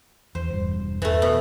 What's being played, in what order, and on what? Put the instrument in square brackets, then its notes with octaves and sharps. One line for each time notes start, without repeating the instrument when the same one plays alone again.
[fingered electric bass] E2 [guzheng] C5
[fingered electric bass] E1 G2
[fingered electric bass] E2 [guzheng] E3 A3
[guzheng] B2